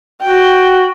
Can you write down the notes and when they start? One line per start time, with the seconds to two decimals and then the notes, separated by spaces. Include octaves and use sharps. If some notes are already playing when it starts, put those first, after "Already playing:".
0.22 F#4 G5